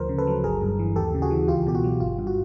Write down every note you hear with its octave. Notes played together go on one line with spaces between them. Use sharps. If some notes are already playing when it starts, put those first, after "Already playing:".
Already playing: D2 F3 A#4 C5
C#3
A4 B4
F#3
G1 G#4 A#4
G2
E3
D#2 G4 A4
C#3
F#4 G#4
E3
C#2 F4 G4
B2 G4
F#4
F#3
G1 F4
G2
F#4